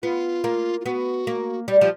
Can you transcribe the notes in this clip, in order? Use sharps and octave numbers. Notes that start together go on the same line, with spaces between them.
B3 F4
A#3
F4
B3 F#4
A#3
G3 G4
F3 G4